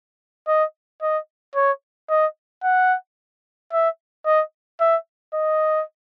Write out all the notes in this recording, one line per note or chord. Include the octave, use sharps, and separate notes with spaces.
D#5
D#5
C#5
D#5
F#5
E5
D#5
E5
D#5